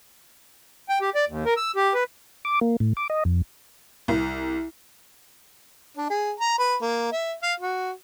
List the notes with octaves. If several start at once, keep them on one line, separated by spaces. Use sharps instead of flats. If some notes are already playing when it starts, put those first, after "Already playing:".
G5
G4
D5
D#2
A#4
E6
G4
B4
D6
A#3
A2
D6
D#5
F2
C2
D4
G#4
A#5
B4
A#3
E5
F5
F#4